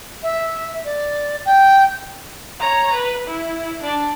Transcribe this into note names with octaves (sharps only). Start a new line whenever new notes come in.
E5
D5
G5
C#5 A#5
B4
E4
D4 D5